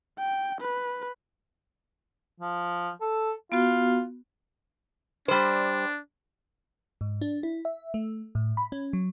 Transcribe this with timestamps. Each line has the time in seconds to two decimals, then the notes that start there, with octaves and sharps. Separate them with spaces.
0.19 G5
0.61 B4
2.40 F3
3.01 A4
3.52 B3 F4 F#4
5.28 G3 D4 C5
7.01 G#2
7.21 D4
7.43 E4
7.65 E5
7.94 A3
8.35 A2
8.57 B5
8.72 C#4
8.93 F#3